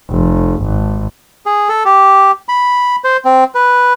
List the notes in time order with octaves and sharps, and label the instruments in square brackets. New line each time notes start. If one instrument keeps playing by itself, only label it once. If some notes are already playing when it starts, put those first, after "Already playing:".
[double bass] F1
G#1
[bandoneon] G#4
A4
G4
B5
C5
C4
B4